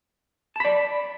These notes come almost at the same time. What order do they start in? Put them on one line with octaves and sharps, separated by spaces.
A5 B5 D5